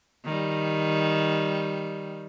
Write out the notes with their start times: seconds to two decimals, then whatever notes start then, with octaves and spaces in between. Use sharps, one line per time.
0.24 D#3 G3